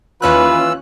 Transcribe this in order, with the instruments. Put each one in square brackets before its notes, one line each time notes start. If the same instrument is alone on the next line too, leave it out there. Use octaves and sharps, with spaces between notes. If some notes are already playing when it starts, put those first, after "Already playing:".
[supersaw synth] D#2 C#4 F#6 [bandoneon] E3 E6 [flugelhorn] F4 [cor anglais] B4